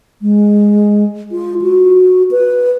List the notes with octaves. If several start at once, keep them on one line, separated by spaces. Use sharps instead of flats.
G#3
F4
F#4
B4